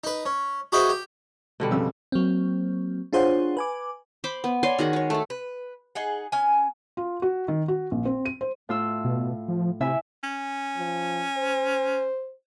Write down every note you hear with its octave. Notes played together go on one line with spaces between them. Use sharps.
D#4 B4
C#4
F#4 G#4 B4 C5 D#5 E5
G4
B2 D3 G3
F2 C#3 E6
F#3 A#3 C4
D4 F4 G#4 C5 C#5 F#5
B4 G#5 D6
C5 B5 D6
B3
C#5 D5 G#5 C6
D#3 F#4 G#4 F#5
G#3 C#5
A3 A4
B4
D#4 G#4 F#5
C#4 G#5
F4
F#4
D#3
F#4
A#1
C4
D#7
C5
A2 F4 E6
B2
F3
C3 E4 E5 G#5
C#4
F3
C5